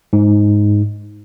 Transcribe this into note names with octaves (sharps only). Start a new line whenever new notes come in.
G#2